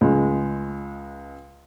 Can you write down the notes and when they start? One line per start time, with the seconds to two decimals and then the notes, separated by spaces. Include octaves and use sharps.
0.01 C#2 G#3